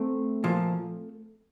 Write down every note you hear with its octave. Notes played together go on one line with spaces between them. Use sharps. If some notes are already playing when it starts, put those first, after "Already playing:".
Already playing: A3 C4
A#2 F3